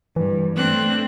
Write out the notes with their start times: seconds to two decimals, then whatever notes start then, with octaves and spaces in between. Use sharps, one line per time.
0.16 G2 E3
0.57 A3 C4 D4 F#6